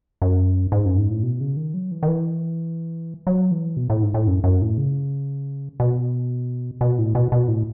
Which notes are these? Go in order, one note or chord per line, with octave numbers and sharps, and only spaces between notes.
F#2
G#2
F#2
G#2
A2
B2
C#3
D#3
F#3
E3
D#3
E3
F#3
E3
B2
A2
G#2
A2
F#2
F#2
A2
C#3
B2
B2
A2
B2
B2
A2